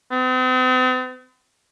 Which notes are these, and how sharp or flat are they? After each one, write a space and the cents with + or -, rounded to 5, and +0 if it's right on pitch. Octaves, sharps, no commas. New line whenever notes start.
C4 -45